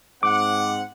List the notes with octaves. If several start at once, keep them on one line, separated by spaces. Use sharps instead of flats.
G#2 C4 F#5 D6